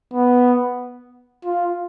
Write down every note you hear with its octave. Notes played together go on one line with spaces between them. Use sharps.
B3
F4